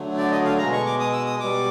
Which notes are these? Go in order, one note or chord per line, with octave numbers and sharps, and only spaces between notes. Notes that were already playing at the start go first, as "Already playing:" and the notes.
Already playing: D3 F#3 A3
D5
D#5
F5
B2 G#3 A#5
C#6
D6
D#6
E6
D#6
B2 G3 D6